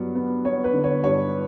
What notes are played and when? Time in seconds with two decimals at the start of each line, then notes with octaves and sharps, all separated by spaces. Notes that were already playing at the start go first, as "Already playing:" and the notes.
Already playing: G2 F#3 B3
0.15 B3
0.45 B3 C#5
0.64 B4
0.73 D3
0.84 C#5
1.03 G2 C#5